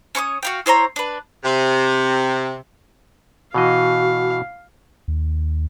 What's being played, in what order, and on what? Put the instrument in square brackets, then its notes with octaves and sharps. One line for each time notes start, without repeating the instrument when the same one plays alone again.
[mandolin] C#4 C#5 C#6 D#6
F#4 F5 G5
E4 C5 C#5 A#5
D4 B4
[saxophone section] C3
[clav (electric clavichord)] B2 E3 D#5 [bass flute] F#4 [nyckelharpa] F5
[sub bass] D#2